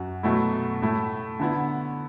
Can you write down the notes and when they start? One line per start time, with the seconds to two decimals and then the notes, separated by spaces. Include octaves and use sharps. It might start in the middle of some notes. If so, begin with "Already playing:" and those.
Already playing: F#2 F#4
0.23 B2 F#3 A3 E4
0.82 A2 A3 E4
1.40 D3 B3 E4